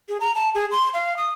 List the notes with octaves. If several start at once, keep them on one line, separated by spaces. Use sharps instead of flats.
G#4
A#5
A5
G#4
C6
F5
D#6